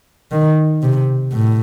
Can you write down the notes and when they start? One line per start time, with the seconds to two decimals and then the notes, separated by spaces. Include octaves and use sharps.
0.32 D#3
0.82 C3
1.32 A2